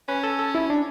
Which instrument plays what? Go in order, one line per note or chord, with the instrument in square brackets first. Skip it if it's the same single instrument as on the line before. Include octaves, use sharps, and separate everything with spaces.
[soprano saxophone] C#4 [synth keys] B4
[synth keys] A4
A4
E4
D4